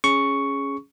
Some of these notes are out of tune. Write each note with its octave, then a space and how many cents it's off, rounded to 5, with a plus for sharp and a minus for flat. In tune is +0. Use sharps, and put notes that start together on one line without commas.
C#4 +0 G#4 +0 C#6 +5